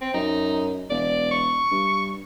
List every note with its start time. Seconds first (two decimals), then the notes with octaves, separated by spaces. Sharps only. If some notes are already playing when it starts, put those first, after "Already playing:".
0.01 C4
0.14 F#2 D#4
0.90 E1 D5
1.31 C#6
1.71 G2